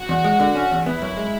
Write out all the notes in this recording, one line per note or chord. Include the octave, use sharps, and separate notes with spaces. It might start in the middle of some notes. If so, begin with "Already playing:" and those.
Already playing: F#4
E2
G#3
D3
C#4
E2
B3 E4
F#2
G#3